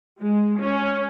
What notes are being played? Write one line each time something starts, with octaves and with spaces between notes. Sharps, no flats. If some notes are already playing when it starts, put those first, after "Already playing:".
G#3
C#4